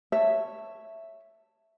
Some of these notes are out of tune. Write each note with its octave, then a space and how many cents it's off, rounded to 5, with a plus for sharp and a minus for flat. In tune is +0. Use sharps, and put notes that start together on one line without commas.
C#5 -5 E5 +0 A5 +15